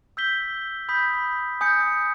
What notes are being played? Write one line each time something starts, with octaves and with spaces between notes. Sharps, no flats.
E6 G6 B6 G7
B5 D#6 G6 B6
G#5 D#6 G6 C#7